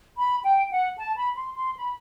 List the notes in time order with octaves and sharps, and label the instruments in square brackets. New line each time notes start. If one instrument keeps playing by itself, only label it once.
[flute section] B5
G5
F#5
A5
B5
C6
C6
B5